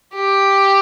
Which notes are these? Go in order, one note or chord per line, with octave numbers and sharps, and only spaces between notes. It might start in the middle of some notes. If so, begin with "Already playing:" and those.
G4